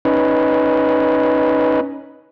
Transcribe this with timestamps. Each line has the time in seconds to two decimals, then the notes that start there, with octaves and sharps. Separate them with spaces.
0.05 C#4 D#4 B4